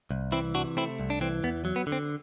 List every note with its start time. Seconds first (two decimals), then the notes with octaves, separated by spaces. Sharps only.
0.11 C2
0.32 E3 C4 E4
0.55 C3 D4 F#4
0.77 A3 C4 E4
1.00 C2
1.10 D4
1.21 E3 C4
1.43 E2 B3
1.65 F#3
1.76 B3
1.87 D3
1.92 C4